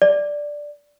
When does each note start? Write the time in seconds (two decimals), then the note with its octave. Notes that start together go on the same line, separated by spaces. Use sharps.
0.02 D5